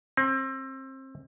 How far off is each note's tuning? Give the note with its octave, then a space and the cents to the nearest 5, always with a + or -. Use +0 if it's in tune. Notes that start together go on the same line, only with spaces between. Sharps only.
C4 +30